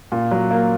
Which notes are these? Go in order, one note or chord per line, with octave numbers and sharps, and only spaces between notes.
A#2
F#3
A#3